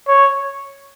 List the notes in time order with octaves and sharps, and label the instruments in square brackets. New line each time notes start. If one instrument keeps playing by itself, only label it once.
[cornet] C#5